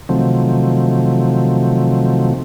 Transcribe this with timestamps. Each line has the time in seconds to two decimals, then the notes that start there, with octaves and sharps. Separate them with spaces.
0.09 C3 D#3 F3 F#3 A3 C4